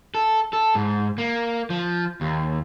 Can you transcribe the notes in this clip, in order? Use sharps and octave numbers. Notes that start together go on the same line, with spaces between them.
A4
A4
G#2
A#3
F3
D#2